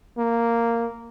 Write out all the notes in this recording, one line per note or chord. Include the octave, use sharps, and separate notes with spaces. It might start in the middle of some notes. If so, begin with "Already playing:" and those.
A#3